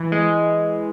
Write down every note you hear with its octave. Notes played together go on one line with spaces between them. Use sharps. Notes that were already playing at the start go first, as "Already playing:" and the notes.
Already playing: E3
G#3